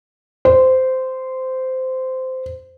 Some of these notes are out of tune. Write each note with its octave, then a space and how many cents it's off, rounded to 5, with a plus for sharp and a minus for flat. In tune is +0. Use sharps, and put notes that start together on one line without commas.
C5 -15